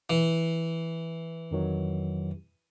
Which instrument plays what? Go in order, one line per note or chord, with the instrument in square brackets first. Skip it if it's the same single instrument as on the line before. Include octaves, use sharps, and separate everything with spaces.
[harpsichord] E3
[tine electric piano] F2 D#3 F#3